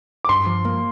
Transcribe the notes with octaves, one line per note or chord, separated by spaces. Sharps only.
D6
G2 C6
F3
A#3